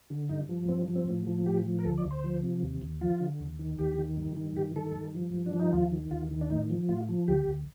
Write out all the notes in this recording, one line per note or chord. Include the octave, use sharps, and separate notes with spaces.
D3
G2 D#4
F3
G2 C4
F3
C4
A2
F3
A2 G4
F3
A#4
D2 A4
D5
D2
C5
F3
C3
D#2
D#2
F3 F4
D3
D#2
D#3
D#2 G4
D#3
G2
D#3
G2 G4
D#3 A4
G2
F3
G2
D4
F3
D#4
D#2 F4
D#3
D#2 F4
D#3
D4
A2 D#4
F3
A2 F4
F3
D2 G4
D2